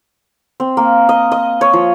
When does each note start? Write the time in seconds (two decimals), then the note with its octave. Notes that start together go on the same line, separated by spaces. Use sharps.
0.60 C4
0.77 A#3
1.09 D#5
1.32 D#5
1.61 C#5
1.73 F3